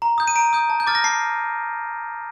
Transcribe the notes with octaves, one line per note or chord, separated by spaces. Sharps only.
A#5
D#6 G6
D#7
A#5 D7
D#6 G6
A5
G6
D6 F6 A6
A#6
A5 C7